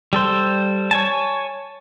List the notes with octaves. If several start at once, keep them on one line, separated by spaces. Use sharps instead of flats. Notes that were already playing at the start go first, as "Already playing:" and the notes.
G3 A4 C5
C#5 G#5 A5